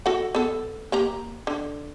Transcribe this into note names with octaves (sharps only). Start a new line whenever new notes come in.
F#4 A4 F#5
B3 A4
A#3 G4 A#5
D3